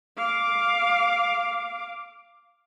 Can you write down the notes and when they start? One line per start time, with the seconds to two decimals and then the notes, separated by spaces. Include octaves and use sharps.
0.17 F5 D6